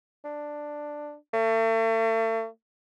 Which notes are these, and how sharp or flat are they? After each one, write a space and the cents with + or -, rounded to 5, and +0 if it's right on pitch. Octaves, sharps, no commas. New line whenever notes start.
D4 +10
A3 +40